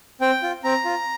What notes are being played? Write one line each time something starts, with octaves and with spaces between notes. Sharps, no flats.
C4 G5
F4
C4 A#5
F4